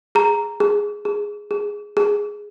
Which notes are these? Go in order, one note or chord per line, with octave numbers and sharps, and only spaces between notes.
G#4 A#5
G#4
G#4
G#4
G#4